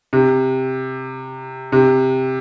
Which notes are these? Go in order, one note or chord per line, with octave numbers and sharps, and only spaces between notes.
C3
C3